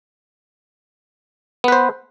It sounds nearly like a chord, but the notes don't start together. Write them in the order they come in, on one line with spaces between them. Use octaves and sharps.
B3 B4 C5